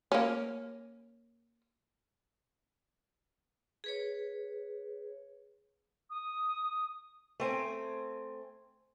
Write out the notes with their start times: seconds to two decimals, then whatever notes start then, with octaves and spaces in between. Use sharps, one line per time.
0.12 A#3 C#4
3.84 G#4 B4 C#5
6.10 D#6
7.40 A3 C4 G#5